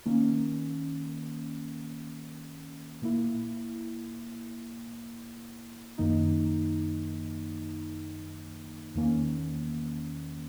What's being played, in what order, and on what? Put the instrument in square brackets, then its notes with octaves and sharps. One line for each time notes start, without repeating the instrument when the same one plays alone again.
[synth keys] D#3 A#3 C#4
A#2 A#3 E4
F#2 D#3 A#3 D#4
E2 D#3 A#3 C#4